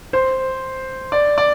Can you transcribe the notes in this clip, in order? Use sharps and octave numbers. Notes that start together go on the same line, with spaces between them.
C5
D5
D5